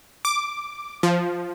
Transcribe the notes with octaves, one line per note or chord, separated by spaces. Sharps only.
D6
F3